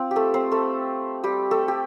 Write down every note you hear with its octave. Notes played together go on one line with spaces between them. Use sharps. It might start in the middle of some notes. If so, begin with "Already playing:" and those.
Already playing: C4 F4
G4
A3 A4
C4 C5
A3 A4
G3 G4
A3 A4
G4